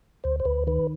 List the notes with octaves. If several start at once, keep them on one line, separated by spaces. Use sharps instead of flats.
D2 C5
C5
D2 B4
D#3 B4